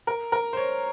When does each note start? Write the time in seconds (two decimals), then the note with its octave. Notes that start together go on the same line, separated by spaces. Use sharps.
0.07 A#4
0.32 A#4
0.53 C5
0.57 C#5